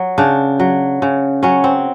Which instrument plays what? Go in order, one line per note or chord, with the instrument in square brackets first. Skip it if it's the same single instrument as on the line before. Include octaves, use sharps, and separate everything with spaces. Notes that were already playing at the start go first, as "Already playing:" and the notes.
Already playing: [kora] F#3
C#3 D4
F#3
C#3
F#3 C#4
C4